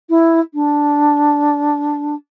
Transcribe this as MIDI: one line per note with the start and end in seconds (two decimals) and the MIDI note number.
0.09 0.40 64
0.54 2.15 62